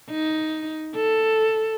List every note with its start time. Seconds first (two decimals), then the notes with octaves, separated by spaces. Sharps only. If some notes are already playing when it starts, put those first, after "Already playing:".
0.10 D#4
0.96 A4